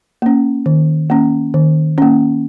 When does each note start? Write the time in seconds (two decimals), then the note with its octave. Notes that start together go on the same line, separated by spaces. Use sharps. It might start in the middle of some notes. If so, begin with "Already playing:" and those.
0.22 A#3 C#4
0.66 D#3
1.10 A#3 C#4
1.54 D#3
1.98 A#3 C#4